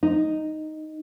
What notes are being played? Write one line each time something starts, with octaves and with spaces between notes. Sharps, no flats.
D#4